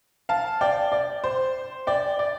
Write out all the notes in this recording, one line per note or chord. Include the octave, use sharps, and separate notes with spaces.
F5 A5
D5 G5
D5
C5
D5 G5
D5